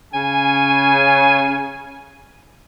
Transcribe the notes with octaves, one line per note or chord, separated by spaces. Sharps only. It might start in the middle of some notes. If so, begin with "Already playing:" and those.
C#3 G#5